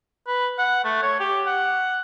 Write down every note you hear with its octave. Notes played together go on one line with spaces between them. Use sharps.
B4
F#5
A3
C#5
G4
F#5